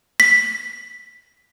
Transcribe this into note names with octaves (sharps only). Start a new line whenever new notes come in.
B6